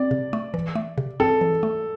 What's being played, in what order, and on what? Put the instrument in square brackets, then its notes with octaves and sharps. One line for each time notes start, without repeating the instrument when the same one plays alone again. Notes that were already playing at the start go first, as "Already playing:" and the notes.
Already playing: [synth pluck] C4 [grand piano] D5
[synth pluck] C3
A3
E3
A3
C3
[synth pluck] C4 [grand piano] A4
[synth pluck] E3
A3